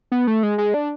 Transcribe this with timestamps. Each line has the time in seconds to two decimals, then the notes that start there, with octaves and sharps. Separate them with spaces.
0.12 B3
0.27 A3
0.43 G#3
0.58 G#3
0.74 D4